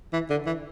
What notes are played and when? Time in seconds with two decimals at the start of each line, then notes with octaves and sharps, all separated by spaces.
0.13 E3
0.30 D3
0.46 E3